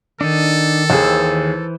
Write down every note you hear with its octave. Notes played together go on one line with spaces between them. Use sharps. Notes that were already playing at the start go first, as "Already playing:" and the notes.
D#3 D4 D#4 A4
D#2 E3 G#4 C5 E6